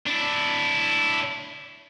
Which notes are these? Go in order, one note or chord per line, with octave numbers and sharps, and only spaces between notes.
D4 E4